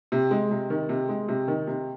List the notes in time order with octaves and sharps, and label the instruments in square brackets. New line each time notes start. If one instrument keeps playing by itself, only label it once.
[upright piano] C3
G#3
C3
D#3
C3
G#3
C3
D#3
C3